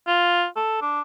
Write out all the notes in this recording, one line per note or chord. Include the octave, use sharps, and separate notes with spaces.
F4
A4
D4